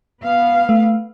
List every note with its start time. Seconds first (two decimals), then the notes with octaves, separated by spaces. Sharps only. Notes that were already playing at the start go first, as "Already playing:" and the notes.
0.23 B3 F5
0.69 A3